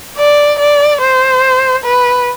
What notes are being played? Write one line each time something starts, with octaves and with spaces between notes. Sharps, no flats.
D5
D5
C5
B4